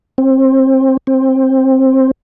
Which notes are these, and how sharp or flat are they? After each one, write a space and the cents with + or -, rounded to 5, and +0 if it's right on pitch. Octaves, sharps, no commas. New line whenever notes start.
C4 +25
C4 +15